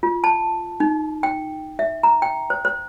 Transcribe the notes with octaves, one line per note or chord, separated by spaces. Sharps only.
F4
A5
D#4
G5
E5
A#5
G5
C5
C5